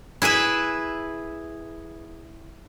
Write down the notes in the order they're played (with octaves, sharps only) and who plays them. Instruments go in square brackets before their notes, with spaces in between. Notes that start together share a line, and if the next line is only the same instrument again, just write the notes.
[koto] E4 G#4 B4 E5